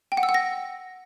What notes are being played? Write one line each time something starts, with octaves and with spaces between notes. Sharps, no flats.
G5
F#5
E6
F#5
A#6